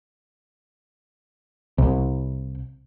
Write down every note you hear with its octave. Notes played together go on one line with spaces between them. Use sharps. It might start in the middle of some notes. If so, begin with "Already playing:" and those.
C2